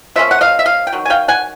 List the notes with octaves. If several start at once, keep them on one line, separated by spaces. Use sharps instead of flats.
F3 A#3 C#4 E5
F#5
D#5 F5
E5
D#5 F5
G5
D#3 F#3
G#5
F5 G5
F#5 G#5